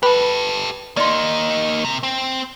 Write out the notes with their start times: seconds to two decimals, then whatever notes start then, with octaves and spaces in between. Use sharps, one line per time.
0.03 G4 A4 B4 B5
0.97 A#3 D#4 D5 C6
1.84 C3
2.03 C4